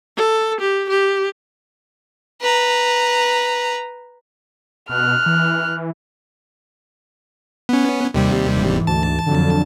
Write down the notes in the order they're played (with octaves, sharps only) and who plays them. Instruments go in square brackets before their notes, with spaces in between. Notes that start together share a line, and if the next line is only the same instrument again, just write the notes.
[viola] A4
G4
G4
[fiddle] B4 A#5
[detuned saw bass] B2 [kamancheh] F6 F#6
[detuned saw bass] E3
[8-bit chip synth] B3 C#4
D#2 C3 G3
[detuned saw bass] E1 [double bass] G#2 E3
[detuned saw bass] D2 [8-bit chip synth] A5
[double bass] F2 F#3 [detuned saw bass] D3